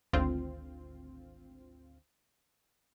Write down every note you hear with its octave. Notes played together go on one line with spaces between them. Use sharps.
G#1 D2 C4 F4